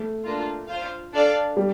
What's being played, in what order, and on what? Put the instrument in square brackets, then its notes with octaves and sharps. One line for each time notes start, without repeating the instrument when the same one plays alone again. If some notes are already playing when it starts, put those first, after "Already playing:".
Already playing: [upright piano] A3
[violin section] A#3 D4 F4
F4 C5 F5
D4 A4 D5 F5
[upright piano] G3